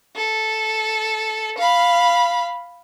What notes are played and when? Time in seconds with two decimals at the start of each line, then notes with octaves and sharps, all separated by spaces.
0.16 A4
1.58 F5 B5